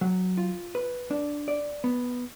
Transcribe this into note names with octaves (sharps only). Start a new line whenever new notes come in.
F#3
F4
B4
D4
D5
B3